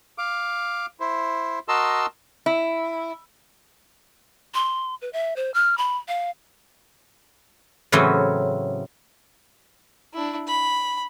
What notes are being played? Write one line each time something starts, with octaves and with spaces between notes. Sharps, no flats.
F5 D6
E4 C5
F#4 A#4 D#5 A5 C6 E6
E4
C6
B4
E5
C5
F6
B5
F5
A2 C#3 E3 F#3 C4 C#4
D4 E4
B5